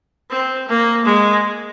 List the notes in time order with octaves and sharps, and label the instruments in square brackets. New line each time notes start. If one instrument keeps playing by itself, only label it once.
[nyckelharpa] C4
A#3
G#3